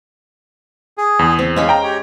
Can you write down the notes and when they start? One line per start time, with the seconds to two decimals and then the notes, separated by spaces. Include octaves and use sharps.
0.98 G#4
1.19 E2
1.39 C4
1.56 G#3 C#4 F5 B5
1.69 G5 A#5
1.83 G4 C#5